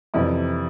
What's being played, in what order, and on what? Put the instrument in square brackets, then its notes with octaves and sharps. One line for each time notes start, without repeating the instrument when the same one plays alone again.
[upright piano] F2 C3 E3 D5